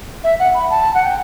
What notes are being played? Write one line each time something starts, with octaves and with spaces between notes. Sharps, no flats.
E5
F#5
B5
A5
F#5
G5